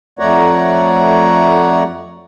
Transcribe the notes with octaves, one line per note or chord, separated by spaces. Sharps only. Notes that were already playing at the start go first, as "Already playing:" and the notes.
F2 A3 C#5 D5 F#5 A#5